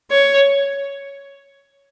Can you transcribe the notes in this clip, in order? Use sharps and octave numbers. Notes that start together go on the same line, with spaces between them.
C#5